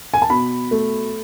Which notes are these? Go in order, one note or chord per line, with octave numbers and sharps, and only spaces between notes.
G#5
A5
B2 B5
A3